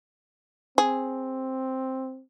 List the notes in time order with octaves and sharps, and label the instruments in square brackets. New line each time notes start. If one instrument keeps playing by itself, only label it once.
[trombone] C4 [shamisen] G#4